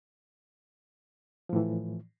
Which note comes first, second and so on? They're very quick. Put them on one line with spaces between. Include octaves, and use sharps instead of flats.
F3 A2 E3